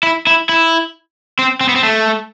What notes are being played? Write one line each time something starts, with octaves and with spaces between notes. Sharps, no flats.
E4
E4
E4
C4
C4
B3
C4
A3